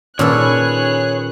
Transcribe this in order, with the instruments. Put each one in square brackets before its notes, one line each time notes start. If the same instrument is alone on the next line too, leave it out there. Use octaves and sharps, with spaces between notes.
[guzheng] A#2 A4 [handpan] D#3 C#4 B4 [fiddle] G#4 F#6 [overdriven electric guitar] C#5